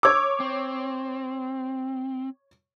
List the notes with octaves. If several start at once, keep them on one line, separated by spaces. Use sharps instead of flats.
C#5 D6 E6 G#6
C4